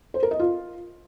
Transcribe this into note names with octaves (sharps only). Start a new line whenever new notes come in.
C5
A#4
D#5
F4